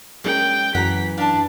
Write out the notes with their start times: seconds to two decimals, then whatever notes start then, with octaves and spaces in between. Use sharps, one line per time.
0.24 G#3 C#4 A#4 D5 G5
0.75 F#2 E3 F#5 A#5 B6
1.18 D4 F5 A5